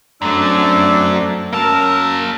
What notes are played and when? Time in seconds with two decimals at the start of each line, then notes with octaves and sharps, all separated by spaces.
0.22 F#2 F#3 A3 C4 D4 E6
1.53 F#2 A#3 A#4 A5 E6